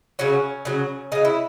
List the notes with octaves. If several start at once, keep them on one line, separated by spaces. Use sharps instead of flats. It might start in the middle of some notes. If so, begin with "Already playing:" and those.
C#3 F#3 C#4
C#3 F#3
C#3 F#3 D#4
E4